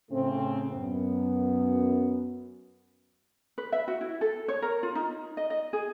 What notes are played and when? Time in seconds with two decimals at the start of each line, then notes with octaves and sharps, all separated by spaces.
0.11 A2 C#3 A3 C4
0.73 F#2 B3
3.58 B4
3.72 E5
3.88 F#4
4.01 E4
4.21 A4
4.48 C#5
4.62 A#4
4.83 F4
4.95 D#4
5.37 D#5
5.50 D#5
5.73 G#4